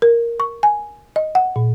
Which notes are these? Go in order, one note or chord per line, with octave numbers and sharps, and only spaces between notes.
A#4
C#6
G#5
D#5
F#5
A#2